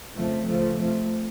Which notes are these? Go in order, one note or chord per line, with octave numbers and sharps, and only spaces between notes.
F2 C#3 F3 A3
C#2 C#3 F3 A3
F2 C3 F3 A3